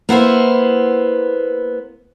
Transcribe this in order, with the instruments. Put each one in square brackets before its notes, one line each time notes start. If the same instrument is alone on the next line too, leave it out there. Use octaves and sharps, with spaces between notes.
[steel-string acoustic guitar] A#3 B3 E4 C5